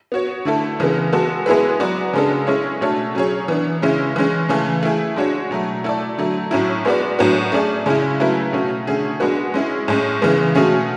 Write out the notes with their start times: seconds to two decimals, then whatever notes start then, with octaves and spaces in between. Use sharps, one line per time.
0.12 B3 F#4 C#5
0.45 D3 A3 E4 A4
0.80 C#3 E3 G#3 B3
1.13 G#3 B3 F#4 A4
1.46 G#3 B3 E4 G#4 B4
1.80 F#3 B3 F#4 B4 D5
2.13 C#3 G#3 B3 D4 A4
2.47 G#3 C#4 E4 G#4 C#5
2.81 B2 A3 D4 A4 C#5
3.15 F#3 C#4 G#4 C#5
3.48 E3 B3 D4
3.82 C#3 G#3 C#4 E4
4.16 E3 G#3 C#4
4.49 C#3 E3 A3
4.83 A3 E4 G#4
5.16 G#3 D4 F#4 C#5
5.51 B2 F#3 A3
5.84 A3 E4 A4 D5
6.18 D3 F#3 A3
6.51 A2 F#3 C#4 E4
6.85 G#3 B3 F#4 B4 D5
7.19 A2 F#3 B3 D4 F#4
7.52 A3 C#4 G#4 D5
7.86 C#3 G#3 C#4 E4
8.20 C#3 F#3 A3 E4 B4
8.53 B2 A3 C#4
8.87 D3 A3 C#4 G#4
9.20 G#3 B3 D4 F#4 B4
9.54 G#3 C#4 E4 G#4
9.88 A2 G#3 C#4
10.22 C#3 E3 G#3 B3
10.55 B2 A3 C#4 G#4